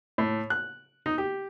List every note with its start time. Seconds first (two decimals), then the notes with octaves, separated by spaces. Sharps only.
0.18 A2
0.50 F#6
1.06 D#4
1.18 G4